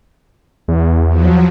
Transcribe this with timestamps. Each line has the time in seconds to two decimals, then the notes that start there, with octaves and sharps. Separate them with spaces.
0.68 E2
1.08 F3 F#3